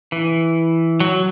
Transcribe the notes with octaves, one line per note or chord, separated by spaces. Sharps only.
E3
F#3